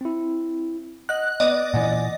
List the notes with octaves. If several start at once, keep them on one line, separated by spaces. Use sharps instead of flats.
C4 E4
D#5 F#5 F#6
B3 D5 D#5
A#2 E3 F#5 G#5